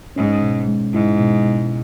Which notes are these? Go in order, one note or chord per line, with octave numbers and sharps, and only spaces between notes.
G#2 C#4
B2
G#3
G#2 E4
B2
B2